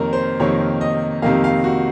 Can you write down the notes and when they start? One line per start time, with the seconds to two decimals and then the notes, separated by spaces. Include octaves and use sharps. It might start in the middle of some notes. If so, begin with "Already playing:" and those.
Already playing: F2 C3 D#3 A#3 A#4 C#5
0.13 C5
0.40 F2 C3 D#3 A#3 C#5
0.81 D#5
1.22 F2 C3 D#3 A#3 F5
1.44 F5
1.64 F#4